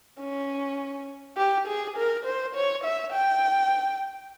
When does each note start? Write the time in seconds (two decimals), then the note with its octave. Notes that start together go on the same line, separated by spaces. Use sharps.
0.21 C#4
1.37 G4
1.67 G#4
1.97 A#4
2.25 C5
2.55 C#5
2.84 E5
3.13 G5